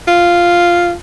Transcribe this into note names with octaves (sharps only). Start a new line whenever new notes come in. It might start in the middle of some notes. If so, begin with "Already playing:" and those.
F4